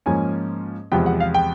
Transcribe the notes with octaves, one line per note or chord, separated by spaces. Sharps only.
G#2 F3 A#3 C#4 G#5
E2 C3 F3 G#3 B3 G5
F#5
F5
G5